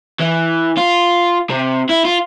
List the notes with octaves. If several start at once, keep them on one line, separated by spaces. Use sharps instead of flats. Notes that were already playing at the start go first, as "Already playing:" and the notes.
E3
F4
C3
E4
F4